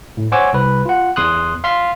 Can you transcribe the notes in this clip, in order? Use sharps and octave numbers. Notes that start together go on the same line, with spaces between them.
A2
C5 C#5 F#5 G#5 D6 E6
C2 B4
F4 F#5
E2 C6 D#6 F#6
F5 C6 F6 B6 C7